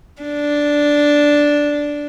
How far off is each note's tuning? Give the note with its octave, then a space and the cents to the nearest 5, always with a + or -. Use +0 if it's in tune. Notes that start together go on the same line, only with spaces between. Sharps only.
D4 -5